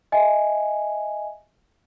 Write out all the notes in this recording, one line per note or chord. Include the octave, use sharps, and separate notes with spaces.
D#5 E5 G#5